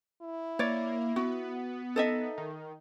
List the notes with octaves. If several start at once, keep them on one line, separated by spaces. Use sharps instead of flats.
E4
A#3 C#5 D5
B3 F#4
D#4 A4 D#5 E5
D#3